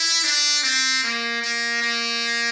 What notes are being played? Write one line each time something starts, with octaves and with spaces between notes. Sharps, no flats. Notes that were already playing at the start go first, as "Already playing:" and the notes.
Already playing: E4
D4
C4
A#3
A#3
A#3